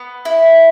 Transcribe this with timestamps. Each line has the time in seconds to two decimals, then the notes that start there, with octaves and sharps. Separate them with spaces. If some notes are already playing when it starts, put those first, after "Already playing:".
Already playing: B3
0.25 E4